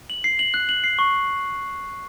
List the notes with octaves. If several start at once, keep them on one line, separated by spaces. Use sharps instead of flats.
F#7
C7
F#7
F#6
F#7
C7
C#6